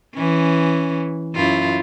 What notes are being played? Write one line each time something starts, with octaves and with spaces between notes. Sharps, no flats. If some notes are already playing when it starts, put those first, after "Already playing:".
E3 C#4
F#2 E4 F4